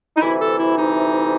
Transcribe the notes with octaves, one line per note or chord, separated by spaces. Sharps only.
D#4
D2 C3 E3 E4
A4
E4
D#4